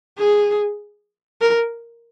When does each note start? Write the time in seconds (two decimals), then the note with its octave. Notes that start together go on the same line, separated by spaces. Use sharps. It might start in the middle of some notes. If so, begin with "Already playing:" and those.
0.18 G#4
1.41 A#4